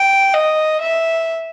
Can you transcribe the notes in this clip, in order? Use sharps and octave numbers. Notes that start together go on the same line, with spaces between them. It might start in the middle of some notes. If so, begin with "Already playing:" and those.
Already playing: G5
D#5
E5